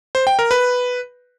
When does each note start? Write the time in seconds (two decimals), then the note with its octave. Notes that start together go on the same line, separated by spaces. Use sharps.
0.15 C5
0.27 G5
0.39 A#4
0.51 B4